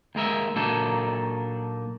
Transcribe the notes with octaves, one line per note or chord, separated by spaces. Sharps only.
D#2 G#3 A#4 E5
A#2 F#3 A#3 D4 D#4 A4